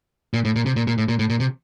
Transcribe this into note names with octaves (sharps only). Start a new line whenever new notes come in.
A#2
A2
A#2
C3
A#2
A#2
A2
A#2
A2
A#2
C3